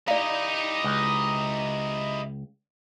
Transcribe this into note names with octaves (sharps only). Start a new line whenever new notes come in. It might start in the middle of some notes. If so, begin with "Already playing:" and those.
E4 G4 D5 D#5 F5 A#5
C#2